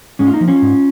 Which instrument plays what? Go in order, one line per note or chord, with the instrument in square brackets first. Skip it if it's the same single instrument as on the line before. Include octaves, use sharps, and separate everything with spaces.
[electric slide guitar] G#2 G#3 C#4
F4
A#3 D#4
F3
C#4 F4
G#2